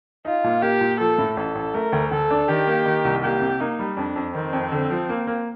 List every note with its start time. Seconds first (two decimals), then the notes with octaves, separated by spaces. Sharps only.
0.25 D#4 F4
0.44 A#2
0.62 A#3 G4
0.81 A#2
0.99 F3 A4
1.18 A2
1.37 A1 A4
1.55 A1
1.74 A3 A#4
1.92 D2
2.11 D2 A4
2.31 D4
2.48 D#3 G4
2.67 A#3
2.86 D#3
3.05 C2
3.23 A#3 G4
3.41 C3
3.60 A#3 D#4
3.79 G3
3.97 F2 D4
4.16 F2
4.35 D#3 C4
4.53 F2
4.72 D3
4.90 F3
5.09 A#3
5.27 A#3